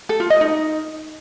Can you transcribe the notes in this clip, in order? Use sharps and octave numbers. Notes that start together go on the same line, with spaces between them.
A4
F4
D#5
D#4